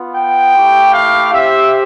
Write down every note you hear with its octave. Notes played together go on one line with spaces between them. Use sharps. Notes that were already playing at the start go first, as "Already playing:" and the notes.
Already playing: B3 F4
G5
A3 E4 G4
F5
C4 G4 E5